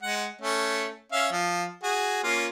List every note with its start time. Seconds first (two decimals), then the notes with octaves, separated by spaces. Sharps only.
0.03 G#3 F#5
0.41 A3 C#4
1.12 C#4 E5 F5
1.31 F3
1.83 F#4 G#4
2.24 A#3 C#4 F4